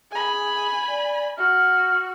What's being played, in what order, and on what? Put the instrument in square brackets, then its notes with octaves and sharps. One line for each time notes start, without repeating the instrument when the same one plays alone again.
[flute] G#4 [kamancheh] G#5 B5
[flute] D5
[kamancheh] F#4 [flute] F6